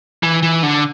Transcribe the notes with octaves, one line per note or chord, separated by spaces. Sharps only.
E3
E3
D3